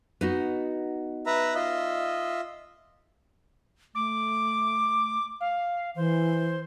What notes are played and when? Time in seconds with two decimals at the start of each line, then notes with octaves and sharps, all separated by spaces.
0.21 B3 D#4 F#4
1.26 B4 E5 A#5
1.55 F4 D#5 E5
3.95 A3 D6
5.40 F5
5.96 E3 C5